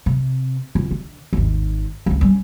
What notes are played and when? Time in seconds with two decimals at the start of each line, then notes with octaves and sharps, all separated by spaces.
0.06 C3
0.75 C#2
0.91 D3
1.33 G#1 D#2
2.06 C#2 C4
2.21 G3 C#4